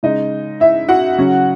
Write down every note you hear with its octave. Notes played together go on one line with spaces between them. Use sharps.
C#3 G#3 D#4 D#5
E4 E5
F#4 F#5
C#3 F#3 C#4